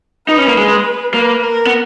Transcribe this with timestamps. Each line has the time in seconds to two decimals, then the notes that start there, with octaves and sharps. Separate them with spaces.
0.28 D#4 B4
0.38 C#4
0.48 A#3
0.58 G#3
1.14 A#3 B4
1.43 A#4
1.67 B3